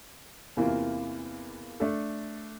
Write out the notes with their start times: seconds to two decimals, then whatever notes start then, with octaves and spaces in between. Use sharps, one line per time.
0.57 E2 C3 E3 A#3 F4
1.80 A3 D4 A4